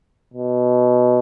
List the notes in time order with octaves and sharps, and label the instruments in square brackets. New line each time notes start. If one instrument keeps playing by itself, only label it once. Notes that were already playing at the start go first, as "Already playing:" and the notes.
[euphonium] B2